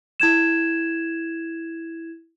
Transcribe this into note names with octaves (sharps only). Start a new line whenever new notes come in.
E4 G#6 E7